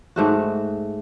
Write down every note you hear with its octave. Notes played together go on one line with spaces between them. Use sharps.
G#2 A3 F#4